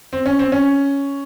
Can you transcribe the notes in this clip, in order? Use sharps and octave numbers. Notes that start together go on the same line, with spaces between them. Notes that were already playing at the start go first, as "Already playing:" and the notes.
C4
C#4
C4
C#4